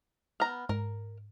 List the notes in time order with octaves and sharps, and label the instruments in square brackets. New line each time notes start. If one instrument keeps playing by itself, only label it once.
[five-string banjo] B3 A#5 [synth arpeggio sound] F6
[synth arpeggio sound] G#2 [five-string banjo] A#4